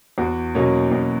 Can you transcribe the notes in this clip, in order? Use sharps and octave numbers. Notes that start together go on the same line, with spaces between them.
E2 F#4
B2 F#3 A#3 C#4
E2